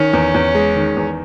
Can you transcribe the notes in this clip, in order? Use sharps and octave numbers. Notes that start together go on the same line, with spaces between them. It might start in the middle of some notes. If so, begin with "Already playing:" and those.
Already playing: D#3 C#4
E2
E2
G#3
D#3
E2